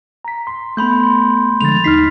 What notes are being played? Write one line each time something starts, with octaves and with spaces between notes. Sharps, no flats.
A#5 B6
C6
A3 B3 B5 C6 G6
D3 F3 G#3 A6 F7
D#2 D#4 F6 B6 C7